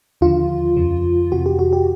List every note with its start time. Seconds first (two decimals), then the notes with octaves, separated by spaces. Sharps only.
0.21 D#2 D3 F3 F4
0.76 F2 C#3 F3
1.32 F2 C3 E3 F#4
1.46 G4
1.59 F#4
1.73 G4